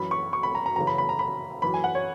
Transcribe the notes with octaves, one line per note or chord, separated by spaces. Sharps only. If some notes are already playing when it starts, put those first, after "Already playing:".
Already playing: F#2 E3 B5
C#6
C#6
B5
A#5
A#5
F#2 C#3 E3 A#5
B5
B5
A#5
B5
F#2 E3 B5
G#5
F#5
C#5